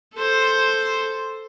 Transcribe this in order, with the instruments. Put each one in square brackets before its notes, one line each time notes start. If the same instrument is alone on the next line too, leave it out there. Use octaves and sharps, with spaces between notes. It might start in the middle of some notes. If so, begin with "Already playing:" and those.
[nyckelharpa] A4 C5